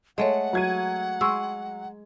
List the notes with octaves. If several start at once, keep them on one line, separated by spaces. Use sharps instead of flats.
G#3 A3 C#5 D#5 F#5
F#3 G#6 D#7
G#3 C6 C#6 E6